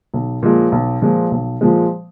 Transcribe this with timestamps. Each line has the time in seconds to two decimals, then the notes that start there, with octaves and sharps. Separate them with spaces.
0.14 B1
0.43 A#2 F3 G#3
0.72 B1
1.02 A#2 F3 G#3
1.31 B1
1.61 A#2 F3 G#3